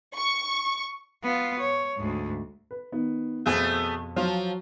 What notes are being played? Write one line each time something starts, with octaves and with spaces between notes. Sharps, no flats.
C#6
B3 F4
C#5
D2 G#2
B4
D#3 B3
F2 B2 A3 B3 G#4
F3 F#3 F4